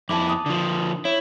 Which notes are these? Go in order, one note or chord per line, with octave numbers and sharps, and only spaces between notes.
F2 E4 A5 D6
D#6
D3 F3
E4 C#5